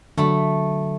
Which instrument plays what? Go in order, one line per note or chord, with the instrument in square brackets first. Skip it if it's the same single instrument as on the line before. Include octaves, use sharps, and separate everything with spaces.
[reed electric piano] D3 F#3 [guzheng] A3 B5